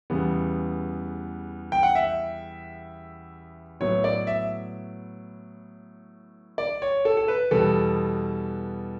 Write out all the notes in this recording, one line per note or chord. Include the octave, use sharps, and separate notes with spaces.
E2 C#3 G3 B3
G5
F#5
E5
A2 F#3 B3 C#5
D5
E5
D5
C#5
A4
A4
B4
E2 B2 G3 B3 A4